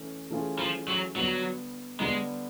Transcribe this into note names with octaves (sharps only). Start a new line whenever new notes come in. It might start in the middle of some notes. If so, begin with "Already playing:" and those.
Already playing: E3 A3 C#4
E3 A3 C#4 F4 G#4
F3
F#3
D3 F#3 G3 B3
D3 G3 G#3 B3